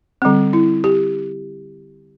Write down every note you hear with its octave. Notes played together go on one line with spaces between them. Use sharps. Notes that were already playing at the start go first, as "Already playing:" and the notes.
D3 G3 C4
E4
G4